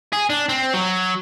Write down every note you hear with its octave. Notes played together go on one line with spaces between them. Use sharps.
G#4
D4
C4
F#3